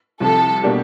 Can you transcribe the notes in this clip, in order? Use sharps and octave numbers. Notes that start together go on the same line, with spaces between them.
C2 C3 F3 A4
B2 G3 A#3 D4 G4